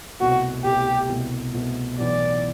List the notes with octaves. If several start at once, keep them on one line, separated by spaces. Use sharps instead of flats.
C2 B2 A3 F#4
C2 B2 A3 G4
C2 B2 A3
C2 B2 A3
B1 A2 E3 G3 B3 D5